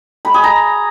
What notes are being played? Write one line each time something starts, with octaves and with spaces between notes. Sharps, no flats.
B5
G#4
A#5